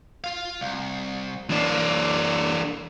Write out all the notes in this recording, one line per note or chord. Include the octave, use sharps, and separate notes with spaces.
F4 F5
C2
F#2 E3 A#3 D4